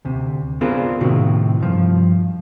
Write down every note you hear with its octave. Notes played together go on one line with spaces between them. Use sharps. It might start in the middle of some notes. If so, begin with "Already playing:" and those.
D2 C3
B3 C4 D4 F4 G#4 A#4
A2 C3 D#3 C4 F#4
G2 F3